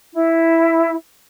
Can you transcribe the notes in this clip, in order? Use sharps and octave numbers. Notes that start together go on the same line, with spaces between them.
E4